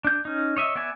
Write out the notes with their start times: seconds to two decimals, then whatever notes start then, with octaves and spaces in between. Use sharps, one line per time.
0.05 D4 G6
0.25 C#4 D#4
0.57 C#5 D#5 E5
0.76 B3 D5 E5 G#5